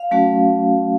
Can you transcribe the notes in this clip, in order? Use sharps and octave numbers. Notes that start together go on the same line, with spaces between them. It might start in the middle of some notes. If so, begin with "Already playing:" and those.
Already playing: F5
F#3 A3 C#4 F#4